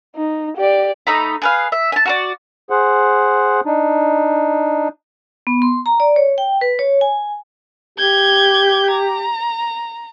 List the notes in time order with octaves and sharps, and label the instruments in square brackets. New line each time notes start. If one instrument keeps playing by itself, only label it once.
[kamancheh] D#4
G4 D5
[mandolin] A3 D#4 A#5 B5
G#4 B4 F5
E5
G#5 A5
F#4 A#4 D5
[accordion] G#4 C5 F#5
D4 D#4
[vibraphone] B3
C6
A#5
D5
C#5
G5
B4
C#5
G#5
[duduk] G4 [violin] G6 G#6
[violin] A#5